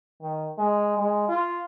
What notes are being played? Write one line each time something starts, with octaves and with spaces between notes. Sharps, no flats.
D#3
G#3
G#3
F4